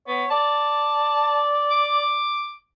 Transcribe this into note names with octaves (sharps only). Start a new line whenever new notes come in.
B3 C#5
D5 A5
D6